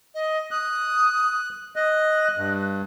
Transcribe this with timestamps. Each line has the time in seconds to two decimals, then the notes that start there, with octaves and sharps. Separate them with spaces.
0.15 D#5
0.51 D#6 F#6
1.76 D#5 F#6
2.38 G2